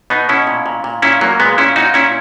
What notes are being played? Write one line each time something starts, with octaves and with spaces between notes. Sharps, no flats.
B2 B3 D#4
B2 C#4 E4
A#2
A#2
A#2
A#2 C#4 E4
A#2 F#3 A#3
A#2 G#3 B3
A#2 C#4 E4
A#2 D#4 F#4
A#2 C#4 E4